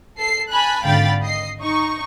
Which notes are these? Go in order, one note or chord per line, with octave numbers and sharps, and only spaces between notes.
A4 C7
G#5 A5 B5 F#6
G#1 D3 F5 G5 B5 A6
D#5 C7
D#4 C#6